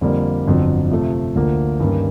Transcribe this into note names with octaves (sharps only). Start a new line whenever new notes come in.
F2 D3 G3 A#3
G1 F2 D3 F#3
C3 F3 A3
D2 D3 F3 A#3
G2 D#3 G3 A#3 C#4